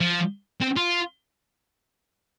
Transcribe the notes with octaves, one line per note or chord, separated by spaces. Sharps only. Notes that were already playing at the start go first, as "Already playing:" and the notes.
F3
C4
F4